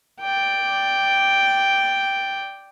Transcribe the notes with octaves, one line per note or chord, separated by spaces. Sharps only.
D5 G5